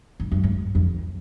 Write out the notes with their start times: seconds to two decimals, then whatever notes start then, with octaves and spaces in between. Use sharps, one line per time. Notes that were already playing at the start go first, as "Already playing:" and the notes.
0.20 F2
0.32 F#2
0.43 G#2
0.75 F2